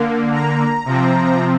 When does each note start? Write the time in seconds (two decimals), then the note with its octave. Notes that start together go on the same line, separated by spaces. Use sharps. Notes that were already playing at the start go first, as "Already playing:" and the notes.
Already playing: D3 A#3
0.33 A#5
0.85 C3 F3 C4